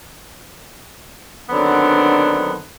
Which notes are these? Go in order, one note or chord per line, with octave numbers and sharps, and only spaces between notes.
D3 D#3 F#3 B3 C4 D4